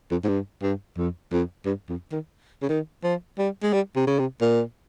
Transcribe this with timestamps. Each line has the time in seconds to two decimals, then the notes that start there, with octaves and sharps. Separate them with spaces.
0.11 F2
0.24 G#2
0.28 G2
0.62 G2
0.97 F2
1.32 F2
1.66 G2
1.89 F2
2.12 D#3
2.62 C#3
2.69 D#3
3.04 F3
3.39 G3
3.63 G#3
3.73 G3
3.96 C3
4.07 C#3
4.19 C3
4.41 A#2